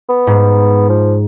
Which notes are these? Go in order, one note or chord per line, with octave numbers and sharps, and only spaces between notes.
B3
G#2
F3